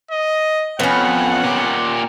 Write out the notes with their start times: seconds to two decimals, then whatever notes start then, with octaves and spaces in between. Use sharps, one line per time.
0.11 D#5
0.80 F2 B3 C#4 F#5
1.44 A#2 G4